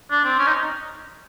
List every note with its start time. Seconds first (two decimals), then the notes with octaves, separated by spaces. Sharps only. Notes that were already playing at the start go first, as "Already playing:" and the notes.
0.11 D4
0.25 C4
0.39 C#4
0.47 D#4